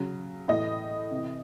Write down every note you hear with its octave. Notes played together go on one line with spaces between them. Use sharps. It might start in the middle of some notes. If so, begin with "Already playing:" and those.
Already playing: C#3 F#3
A2 E3 D#5
C3 E3